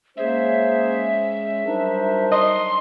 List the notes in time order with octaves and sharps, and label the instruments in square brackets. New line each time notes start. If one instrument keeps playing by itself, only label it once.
[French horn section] G#3 C#4 [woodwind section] A#3 G#4 C5 [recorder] E5
[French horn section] F#3 A#4 C5 [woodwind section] G3 D4 D#4
[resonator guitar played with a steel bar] D#5 [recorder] C6